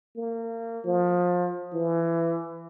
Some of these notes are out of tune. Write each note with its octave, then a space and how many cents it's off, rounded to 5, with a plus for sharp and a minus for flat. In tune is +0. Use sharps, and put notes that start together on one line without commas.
A#3 -30
F3 +25
E3 +20